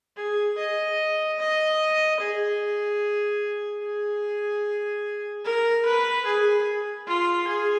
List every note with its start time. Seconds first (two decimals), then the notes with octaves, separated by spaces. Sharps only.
0.17 G#4
0.58 D#5
1.39 D#5
2.20 G#4
3.82 G#4
5.45 A#4
5.85 B4
6.26 G#4
7.07 F4
7.47 G#4